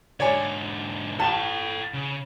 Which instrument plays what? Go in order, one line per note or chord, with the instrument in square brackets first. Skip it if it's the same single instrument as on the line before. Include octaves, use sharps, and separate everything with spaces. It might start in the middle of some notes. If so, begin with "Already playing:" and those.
[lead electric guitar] G#2 D3 [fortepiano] C#5 D5 G#5
[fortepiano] A1 A5 [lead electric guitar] A4 G5
[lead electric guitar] C#3